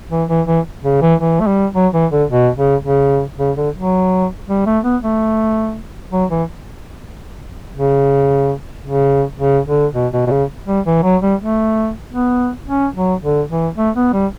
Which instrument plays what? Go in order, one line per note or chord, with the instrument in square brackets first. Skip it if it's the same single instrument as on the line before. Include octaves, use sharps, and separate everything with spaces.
[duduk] E3
E3
E3
C#3
E3
E3
A3
G3
F#3
E3
D3
B2
C#3
C#3
C#3
D3
F#3
G3
A3
B3
A3
F#3
E3
C#3
C#3
C#3
D3
B2
B2
B2
C#3
G3
E3
F#3
G3
A3
B3
C#4
F#3
D3
E3
A3
B3
G3